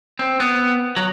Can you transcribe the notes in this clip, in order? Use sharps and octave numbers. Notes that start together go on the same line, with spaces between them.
C4
B3
F#3